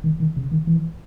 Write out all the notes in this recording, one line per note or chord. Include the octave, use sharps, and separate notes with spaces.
D#3
D#3
C#3
D#3
E3